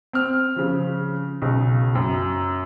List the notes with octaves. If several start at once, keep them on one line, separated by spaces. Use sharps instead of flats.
C4 F6
C#3 F3
B1 C#3
F#2